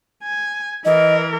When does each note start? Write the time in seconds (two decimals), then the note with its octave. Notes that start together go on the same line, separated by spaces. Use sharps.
0.23 G#5
0.85 E3 A#4 D#5